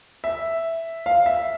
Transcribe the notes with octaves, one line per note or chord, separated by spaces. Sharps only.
E5
F5
E5